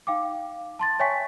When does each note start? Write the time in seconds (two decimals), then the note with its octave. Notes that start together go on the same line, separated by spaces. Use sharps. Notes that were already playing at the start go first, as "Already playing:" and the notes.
0.07 D#4 F5 G5 D6
0.79 A5 C6 A6
1.00 C#5 E5 G5 G#5 C#6 B6